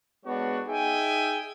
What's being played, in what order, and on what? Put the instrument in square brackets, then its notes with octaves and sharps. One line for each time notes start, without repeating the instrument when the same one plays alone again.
[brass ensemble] G#3 B3 D4 F#4 C#5
D#4 G#4 E5 G5 G#5